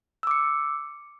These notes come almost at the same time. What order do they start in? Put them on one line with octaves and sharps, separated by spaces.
E6 D6 C#7